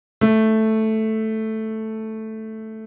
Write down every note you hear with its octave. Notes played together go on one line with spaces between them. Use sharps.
A3